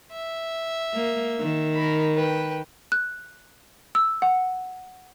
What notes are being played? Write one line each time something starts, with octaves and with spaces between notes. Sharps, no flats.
E5
A#3
D#3
A#4 B5
B4 G5
F#6
E6
F#5